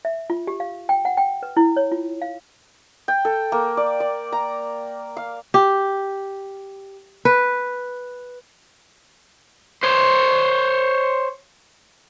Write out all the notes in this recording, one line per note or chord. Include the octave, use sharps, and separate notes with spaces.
E5
F4
G4
F5
G5
F#5
G5
B4
E4
C#5
F4
F5
G5
A4
A#3
D5
D5
A#5
F5
G4
B4
C5 C#5